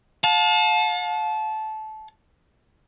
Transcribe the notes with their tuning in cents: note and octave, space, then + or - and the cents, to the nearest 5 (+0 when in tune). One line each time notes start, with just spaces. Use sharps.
F5 +40 A5 -20